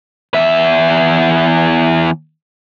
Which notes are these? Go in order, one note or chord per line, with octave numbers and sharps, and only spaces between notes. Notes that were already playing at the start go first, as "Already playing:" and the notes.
E2 E5